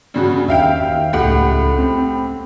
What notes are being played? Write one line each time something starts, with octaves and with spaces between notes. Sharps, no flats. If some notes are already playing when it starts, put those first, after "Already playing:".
G2 C#3 F#4
D#2 E5 F5 G5
D#2
C#2 A2 G4 F#5
C4